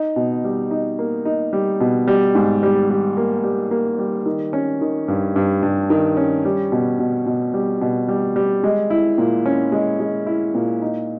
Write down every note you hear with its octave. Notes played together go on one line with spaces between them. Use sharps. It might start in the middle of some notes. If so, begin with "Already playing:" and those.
Already playing: D#4
B2
G3
D#4
A#3
D#4
G3
B2
G3
G#2
G3
G3
A#3
G3
A#3
G3
D#3
C#4
D#3
G2
G2
G2
D#3
C#4
G3
B2
B2
B2
G3
B2
G3
G3
G#3
E4
A#2
C#4
G#3
G#3
E4
A#2
D#4